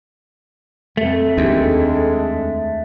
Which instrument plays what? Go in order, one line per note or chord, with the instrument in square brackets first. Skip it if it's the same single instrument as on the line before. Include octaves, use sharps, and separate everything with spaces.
[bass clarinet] F2 [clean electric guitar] A3
[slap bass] D#2 [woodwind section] G#3 D4